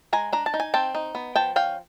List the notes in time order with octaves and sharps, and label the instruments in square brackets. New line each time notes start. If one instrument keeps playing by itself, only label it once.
[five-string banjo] G#3 G#5 A#5
D4 A#5
A5
D#4
G#5
C4 G5 A5
D#4
B3
F3 G5 A5
C#4 F5 G5